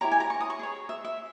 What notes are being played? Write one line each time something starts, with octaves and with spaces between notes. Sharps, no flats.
E4 G4 C#5 A#5
G#5
A#5
C#6
D#6
C#6
G#4 C#5
E5
E5